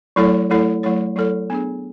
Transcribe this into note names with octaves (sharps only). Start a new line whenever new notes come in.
F#3 A3 E4 A4 C#5
F#3 A3 E4 A4 C#5
F#3 A3 E4 A4 C#5
F#3 A3 E4 A4 C#5
B3 D4 G#4